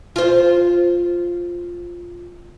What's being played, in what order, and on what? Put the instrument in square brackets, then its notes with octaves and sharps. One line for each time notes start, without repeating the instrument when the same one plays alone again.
[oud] F4 C5